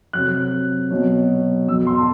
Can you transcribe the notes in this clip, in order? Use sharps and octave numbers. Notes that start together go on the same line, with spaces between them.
C3 F#3 F#6
B2 F#3
B2 F#3 E6
C6
A5